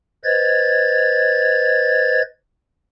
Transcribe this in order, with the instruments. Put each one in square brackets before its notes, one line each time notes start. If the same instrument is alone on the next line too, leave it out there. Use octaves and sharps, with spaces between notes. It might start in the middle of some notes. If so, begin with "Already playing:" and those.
[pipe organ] B4 C5 D#5 G#6 A6